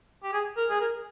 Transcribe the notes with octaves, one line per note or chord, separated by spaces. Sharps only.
G4
G#4
A#4
G#4
A#4